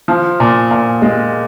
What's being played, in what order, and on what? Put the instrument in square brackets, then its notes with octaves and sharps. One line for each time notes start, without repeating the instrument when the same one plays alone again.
[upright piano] F3
A#2
A#2
G#3